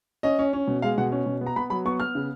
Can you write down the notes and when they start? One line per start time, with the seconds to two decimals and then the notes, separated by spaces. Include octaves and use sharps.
0.23 C#4 D#5
0.39 C#4
0.53 C#4
0.68 B2
0.82 G#3 F5
0.98 B2 F#5
1.12 C#4
1.26 B2
1.41 B3
1.47 A#5
1.56 B3 B5
1.70 F#3 B5
1.85 B3 C#6
2.00 B3 F6
2.15 C#3